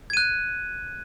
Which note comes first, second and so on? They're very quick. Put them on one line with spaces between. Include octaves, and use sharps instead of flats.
G#6 D#7 F#6